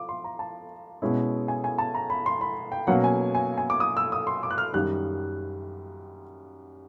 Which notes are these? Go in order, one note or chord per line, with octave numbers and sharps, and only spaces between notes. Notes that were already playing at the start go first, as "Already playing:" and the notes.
Already playing: F3 D6
C6
A#5
A5
B2 G#3 C#4 E4
G#5
G#5
A5
A#5
B5
C6
B5
G5
B2 F#3 A#3 C#4 F#5
G#5
G#5
G#5
D6
D#6
E6
D#6
C6
D6
F#6
F6
F#2 D#3 G3 F#6